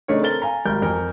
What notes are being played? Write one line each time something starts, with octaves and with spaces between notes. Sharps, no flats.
C#3 A3 D4 D#4 A#4 C#5
C4 A4 A#4 A6 G7
F5 G#5 A#5
G#1 G3 A#4 G6
F2 A#4 G#5